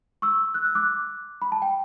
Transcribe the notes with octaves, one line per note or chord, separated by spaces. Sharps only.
C#6 E6
F#6
E6
D6 F#6
B5
A5
G5